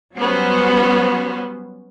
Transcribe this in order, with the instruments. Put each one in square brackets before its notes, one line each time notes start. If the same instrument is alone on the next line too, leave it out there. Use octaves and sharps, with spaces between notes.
[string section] F#3 G3 B3 C#4 F#4 C5